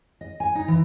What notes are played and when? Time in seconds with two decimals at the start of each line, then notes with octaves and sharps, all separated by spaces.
0.21 D#5
0.40 G#5
0.55 D#4
0.68 E3